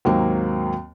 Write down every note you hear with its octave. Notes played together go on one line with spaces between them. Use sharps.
D#2 G#2 F#3 A#3 C4